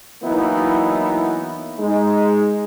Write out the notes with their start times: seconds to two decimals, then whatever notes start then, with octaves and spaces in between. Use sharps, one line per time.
0.23 E3 F#3 A#3 B3 D#4 E4
1.78 G#3 D#4